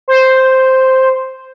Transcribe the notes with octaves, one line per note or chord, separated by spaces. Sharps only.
C5